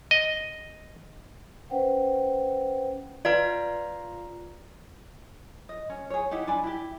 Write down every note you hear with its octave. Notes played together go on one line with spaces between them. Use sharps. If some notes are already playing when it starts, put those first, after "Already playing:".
D#5
C#4 B4 C5 F#5 G5
F4 B4 D5 F5 A#5
D#5
C#4
G#4 C#5
D#4 E4 G4 F#5
D4 D5 G#5 B5
E4 G4